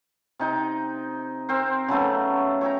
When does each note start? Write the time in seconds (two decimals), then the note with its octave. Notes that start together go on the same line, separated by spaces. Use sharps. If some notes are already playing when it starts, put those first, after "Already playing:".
0.39 C3 D#4 G5
1.49 C4 A#4 C5
1.88 C#3 F#3 A3 B3
2.61 C#5 E5 G5 A#5